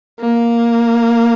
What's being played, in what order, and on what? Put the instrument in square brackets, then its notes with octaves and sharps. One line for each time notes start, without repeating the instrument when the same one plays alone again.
[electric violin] A#3